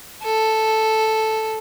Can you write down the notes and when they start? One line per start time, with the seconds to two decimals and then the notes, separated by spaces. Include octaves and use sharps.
0.23 A4